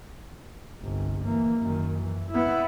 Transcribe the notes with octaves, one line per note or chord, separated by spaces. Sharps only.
G1 C2
E3 A#3
F#2 D#3
E3
B3 E4